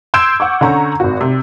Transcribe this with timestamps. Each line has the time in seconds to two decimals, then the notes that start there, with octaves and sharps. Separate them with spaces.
0.14 C6 E6 G6 G#6 D7 E7
0.40 F#5 C#6 D6
0.61 D3 C#4 A#5 C#6
1.00 G#1 F#4
1.21 C3